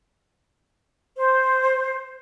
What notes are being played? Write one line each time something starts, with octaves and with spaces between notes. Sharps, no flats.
C5